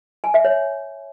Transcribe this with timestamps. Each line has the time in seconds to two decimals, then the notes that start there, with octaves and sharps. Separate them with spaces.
0.24 G#5
0.34 E5
0.45 C#5